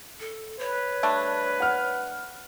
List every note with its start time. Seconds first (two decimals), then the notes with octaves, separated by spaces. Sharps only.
0.20 A4
0.59 B4 C#5
1.03 G3 A3 D4
1.60 F#5 F6